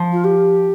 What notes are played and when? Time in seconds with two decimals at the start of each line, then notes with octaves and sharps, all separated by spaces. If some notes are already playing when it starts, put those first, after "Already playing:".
Already playing: F3
0.12 F4
0.24 G4